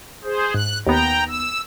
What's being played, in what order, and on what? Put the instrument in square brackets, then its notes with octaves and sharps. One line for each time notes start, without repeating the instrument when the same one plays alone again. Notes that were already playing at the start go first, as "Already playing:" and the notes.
[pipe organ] G#4 C5
[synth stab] G#2 [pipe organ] F#6
[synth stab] D#2 B3 [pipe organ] G5 A#5
[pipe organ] E6